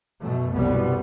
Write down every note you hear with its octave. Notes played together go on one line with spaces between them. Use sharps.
F#2 B2 A3
F#1 C2 B2 G3 B3